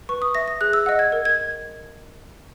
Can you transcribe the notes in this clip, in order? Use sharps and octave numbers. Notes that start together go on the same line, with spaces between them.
B4 C#6
D#6
E5 A#6
A#6
G#4 F#6
E6
D#5 F#5
G#6
A#4
G#6